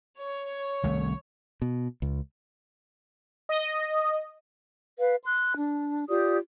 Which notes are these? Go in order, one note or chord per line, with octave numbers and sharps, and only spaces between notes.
C#5
C2 D#3 A3
B2
C#2
D#5
B4 F5
C6 F#6
D4
F4 G4 D5 D#6